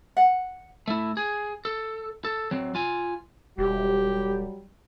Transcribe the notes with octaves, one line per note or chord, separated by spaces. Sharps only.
F#5
A3 E4
G#4
A4
A4
F#3 C4
F4 G#5
E1 F#3 G3 G4